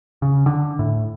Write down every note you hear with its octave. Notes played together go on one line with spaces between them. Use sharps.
C#3
D3
A2